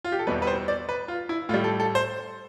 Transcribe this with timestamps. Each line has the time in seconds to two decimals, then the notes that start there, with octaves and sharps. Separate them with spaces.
0.05 F4
0.12 G4
0.19 A4
0.27 E2 B2 G3 B4
0.42 B4
0.47 C5
0.68 D5
0.89 B4
1.08 F4
1.29 E4
1.49 A2 F4
1.54 G3
1.64 A4
1.80 A4
1.95 C5